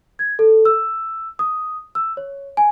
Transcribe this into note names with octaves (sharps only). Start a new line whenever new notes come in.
G#6
A4
E6
D#6
E6
C#5
G#5